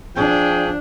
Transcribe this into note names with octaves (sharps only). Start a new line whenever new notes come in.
F3 D4 G#4 G5